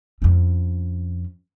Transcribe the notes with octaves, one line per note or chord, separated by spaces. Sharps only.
F2 C#4